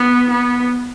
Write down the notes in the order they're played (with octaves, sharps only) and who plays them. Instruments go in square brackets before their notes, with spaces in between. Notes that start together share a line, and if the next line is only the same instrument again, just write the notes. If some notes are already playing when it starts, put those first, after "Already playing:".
Already playing: [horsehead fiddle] B3
B3